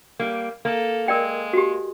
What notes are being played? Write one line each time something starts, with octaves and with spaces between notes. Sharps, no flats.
G3 A#3
A#3 A4
G#3 A#4 D5 G5
F#4 G4